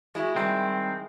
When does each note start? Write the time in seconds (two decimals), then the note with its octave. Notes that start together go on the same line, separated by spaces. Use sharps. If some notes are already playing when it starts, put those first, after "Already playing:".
0.15 G#3 E4 F#4
0.36 D#3 G3 C4